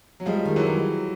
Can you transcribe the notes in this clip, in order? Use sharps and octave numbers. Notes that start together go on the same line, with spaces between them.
F#3
F3 G3 G#3
D#3
E3 F#3
G#3